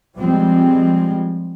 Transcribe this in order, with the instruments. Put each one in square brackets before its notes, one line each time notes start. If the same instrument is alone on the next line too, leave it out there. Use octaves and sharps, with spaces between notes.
[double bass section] F3 G3 G#3 C4